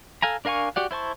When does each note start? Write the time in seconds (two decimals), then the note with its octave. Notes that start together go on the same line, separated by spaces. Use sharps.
0.22 A4 F5 G#5 A#5
0.45 D4 A#4 F5 G#5 C#6
0.76 F#4 G4 D5 F#5
0.91 E4 C5 A5 C#6